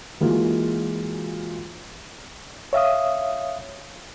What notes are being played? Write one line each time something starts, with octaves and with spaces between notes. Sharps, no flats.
E3 G#3 A#3 F4 F#4
C#5 E5 F5 D#6